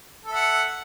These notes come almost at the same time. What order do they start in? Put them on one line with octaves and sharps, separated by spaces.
A4 E5 F#5